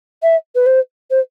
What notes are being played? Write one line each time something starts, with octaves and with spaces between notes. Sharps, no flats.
E5
B4
C5
C5